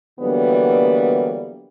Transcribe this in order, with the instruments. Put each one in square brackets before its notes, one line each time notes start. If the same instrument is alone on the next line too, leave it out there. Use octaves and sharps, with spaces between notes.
[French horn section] D3 E3 F#3 G3 A#3 B3